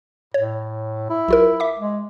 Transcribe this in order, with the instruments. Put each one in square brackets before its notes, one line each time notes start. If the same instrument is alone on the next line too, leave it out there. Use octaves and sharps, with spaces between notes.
[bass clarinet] A2 [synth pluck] C#5
[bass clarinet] E4
[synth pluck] B1 F4 A#4
E5 D6
[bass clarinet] G#3